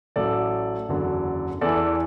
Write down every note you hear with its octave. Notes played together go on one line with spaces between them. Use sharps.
A1 A2 F#3 A4 D5
F#1 E2 D3 F#3
E2 E3 A4 D5